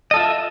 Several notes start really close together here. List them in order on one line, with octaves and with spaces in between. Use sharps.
D#5 A4 F4 E5